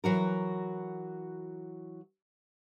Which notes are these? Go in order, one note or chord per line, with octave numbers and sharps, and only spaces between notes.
E3 F#3 F#4 A#4